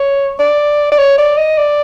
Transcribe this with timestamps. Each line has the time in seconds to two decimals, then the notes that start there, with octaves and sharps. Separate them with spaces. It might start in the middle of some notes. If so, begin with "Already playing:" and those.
Already playing: C#5
0.39 D5
0.92 D5
0.98 C#5
1.18 D5
1.37 D#5
1.58 D5